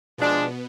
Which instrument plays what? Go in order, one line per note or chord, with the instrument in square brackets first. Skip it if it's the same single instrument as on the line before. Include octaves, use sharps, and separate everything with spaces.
[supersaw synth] B2 B3 [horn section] F3 G#3 D4